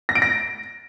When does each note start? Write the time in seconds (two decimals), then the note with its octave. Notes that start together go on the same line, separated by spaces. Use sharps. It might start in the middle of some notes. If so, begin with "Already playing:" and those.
0.09 A#6
0.15 D7
0.22 A#6